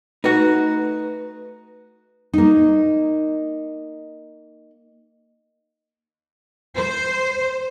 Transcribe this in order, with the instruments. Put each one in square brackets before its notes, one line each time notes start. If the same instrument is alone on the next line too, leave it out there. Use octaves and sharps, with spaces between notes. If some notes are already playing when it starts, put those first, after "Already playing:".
[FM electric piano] A3 B4 [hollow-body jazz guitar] D#4 F#4
[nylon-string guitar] A#3 D#4
[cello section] C5